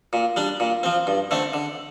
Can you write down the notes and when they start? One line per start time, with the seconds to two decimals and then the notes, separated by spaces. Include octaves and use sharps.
0.13 A#2
0.36 G3 D4
0.60 A#2
0.83 F3 C4
1.07 G2
1.31 D3 A3 C4
1.54 D3